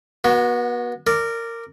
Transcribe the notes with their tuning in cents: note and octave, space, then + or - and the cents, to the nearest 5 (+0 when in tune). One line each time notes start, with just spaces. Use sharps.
B3 -35 F#4 +0
A#4 -15 D5 +0